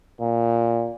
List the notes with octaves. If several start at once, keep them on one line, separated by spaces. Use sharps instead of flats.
A#2